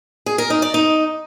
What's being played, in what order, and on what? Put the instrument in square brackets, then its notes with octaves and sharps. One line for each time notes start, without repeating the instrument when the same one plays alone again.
[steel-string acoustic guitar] G#4
A#4
D#4
D5
D#4